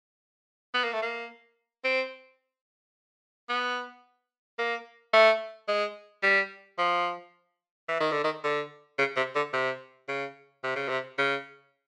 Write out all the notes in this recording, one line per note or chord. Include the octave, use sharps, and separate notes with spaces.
B3
A#3
A3
A#3
C4
B3
A#3
A3
G#3
G3
F3
E3
D#3
D3
D#3
D3
C#3
C3
D3
C3
C#3
C3
C#3
C3
C#3